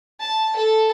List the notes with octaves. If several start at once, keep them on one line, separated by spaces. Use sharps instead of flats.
A5
A4